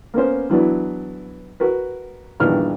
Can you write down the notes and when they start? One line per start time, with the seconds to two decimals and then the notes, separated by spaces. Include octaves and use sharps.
0.14 A#3 B3 C#4 C5
0.49 E3 F#3 B3 D4 E4
1.60 F#4 A#4 B4
2.40 A#1 G2 D#3 E3 B3 F6